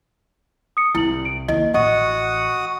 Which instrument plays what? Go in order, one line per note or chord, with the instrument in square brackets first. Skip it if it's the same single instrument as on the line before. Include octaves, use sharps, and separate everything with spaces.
[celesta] D#6 C#7
[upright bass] C2 [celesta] E4 F#7
[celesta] D7
[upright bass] D#2 [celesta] E4 D#5
[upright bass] A1 [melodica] F#4 F#5 D#6 [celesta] D#5